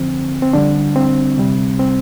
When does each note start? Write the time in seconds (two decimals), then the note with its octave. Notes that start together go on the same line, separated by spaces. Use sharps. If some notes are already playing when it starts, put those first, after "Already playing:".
Already playing: F2 D3 F3 C4
0.42 C4
0.53 F2 D3 G3 D4
0.96 C4
1.38 D2 C3 G3
1.80 C4